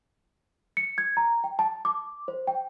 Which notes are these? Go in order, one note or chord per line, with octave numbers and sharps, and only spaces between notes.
C#7
G#6
A#5
G5
A5
D6
C5
G5